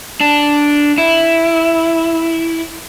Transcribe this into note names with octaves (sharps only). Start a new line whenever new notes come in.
D4
E4